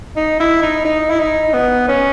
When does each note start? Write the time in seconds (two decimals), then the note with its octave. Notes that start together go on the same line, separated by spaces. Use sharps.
0.16 D#4
0.40 E4
0.63 D#4
0.85 D#4
1.10 E4
1.19 D#4
1.54 B3
1.88 C#4